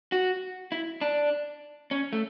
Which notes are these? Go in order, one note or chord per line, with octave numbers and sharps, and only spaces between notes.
F#4
E4
D4
C#4
A3